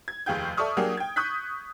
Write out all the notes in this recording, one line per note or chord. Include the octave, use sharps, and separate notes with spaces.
G#6
F1 D#2 G#4 F5 G5 G6
A4 D5 E5 C#6 D#6 F6
F#3 A#3 D4 G4 G#4
G5 G#6
C#6 D#6 F#6 G6 B6